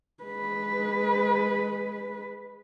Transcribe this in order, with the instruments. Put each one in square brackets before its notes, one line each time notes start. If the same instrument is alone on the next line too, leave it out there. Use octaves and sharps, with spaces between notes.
[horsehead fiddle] G#3 B4